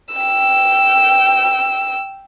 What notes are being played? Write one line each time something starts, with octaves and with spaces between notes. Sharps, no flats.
G5 E6